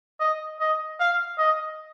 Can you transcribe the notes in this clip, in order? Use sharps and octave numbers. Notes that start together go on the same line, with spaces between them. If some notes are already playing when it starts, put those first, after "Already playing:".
D#5
D#5
F5
D#5